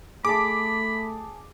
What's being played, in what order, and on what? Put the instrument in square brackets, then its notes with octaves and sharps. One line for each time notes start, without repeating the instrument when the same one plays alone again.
[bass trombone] A3 [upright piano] G#4 A5 [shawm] B5 [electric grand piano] D6